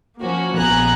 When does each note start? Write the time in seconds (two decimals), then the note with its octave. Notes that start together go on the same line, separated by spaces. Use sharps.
0.21 F3 A#3 C#4 F#4
0.57 A#1 B3 G#5 A#5 F#6